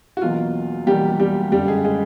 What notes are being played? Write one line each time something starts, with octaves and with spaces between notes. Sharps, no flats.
F#4
E1 E2 B2 F#3 A#3 F4
E1 E2 B2 F#3 G3 A#3 G4
G3 G4
F#1 F#2 D3 G3 G4
G#3 G#4
G#3 G#4